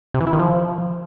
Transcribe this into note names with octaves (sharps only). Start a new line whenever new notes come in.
C3
E3
E4
D#3
F3